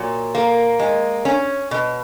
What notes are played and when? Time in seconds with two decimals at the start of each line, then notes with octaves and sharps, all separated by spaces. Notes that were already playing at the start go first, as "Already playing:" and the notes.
Already playing: A#2 F#3
0.35 A#3
0.79 G#3
1.25 C#4
1.71 B2